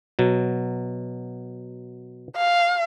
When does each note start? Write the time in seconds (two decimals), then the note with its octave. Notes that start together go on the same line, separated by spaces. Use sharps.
0.19 B2 F#3
2.36 F5